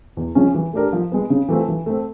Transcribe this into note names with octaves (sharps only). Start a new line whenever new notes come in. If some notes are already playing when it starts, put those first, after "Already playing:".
E2
C#3 F3 G#3 C#4
E3
A3 D4 G4 A#4
F3
G#3 B3
C#3
E3 A3 C4 F4
E3
A3 C4